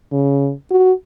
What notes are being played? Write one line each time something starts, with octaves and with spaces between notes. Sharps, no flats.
C#3
F#4